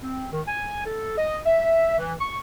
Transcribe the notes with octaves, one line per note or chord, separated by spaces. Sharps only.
C4
D#3
G#5
A4
D#5
E5
E3
C#6